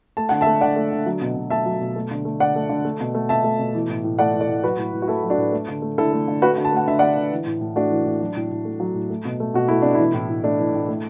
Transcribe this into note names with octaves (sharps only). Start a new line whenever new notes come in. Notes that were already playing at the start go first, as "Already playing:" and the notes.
A3 A5
D3 F#5
E5 A5
A3
D3 D5 F#5
A3
D3
F#3
B2
B2
A3 E5 A5
F#3
B2
A3
D3
A3
D3 D5 F#5
A3
D3
A3
B2
A3
B2 E5 A5
A3
B2
E3
A2
A2
A3 D5 F#5
E3
A4 D5
A2
F#3 F#4 B4
A2
A2
F#4
A3 E4 A4
F#3
D4 F#4
A2
A3
D3
A3
D3 E4 A4
A3
D3
A3 F#4 B4
D3
A5
A3 F#5
D3 E5
A3 D5 F#5
D3
E3
A2
A2
A3 D4 F#4
E3
A2
F#3
A2
A2
A3
F#3
A2
A3
B2
A3
B2 F#4
A3 E4
B2 D4
E3 E4
A2
A2
A3 D4
E3
A2
A3